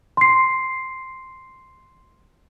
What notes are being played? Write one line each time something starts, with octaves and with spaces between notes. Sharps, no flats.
C6 C7